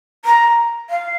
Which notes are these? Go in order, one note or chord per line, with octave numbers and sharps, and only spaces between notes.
A#5
F5